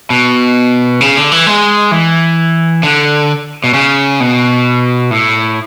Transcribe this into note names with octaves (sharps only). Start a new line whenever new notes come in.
B2
C#3
D3
E3
G#3
E3
D3
B2
C#3
B2
A2